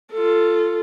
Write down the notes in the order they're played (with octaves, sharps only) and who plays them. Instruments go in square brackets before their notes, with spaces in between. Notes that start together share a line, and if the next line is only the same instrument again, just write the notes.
[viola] F4 A4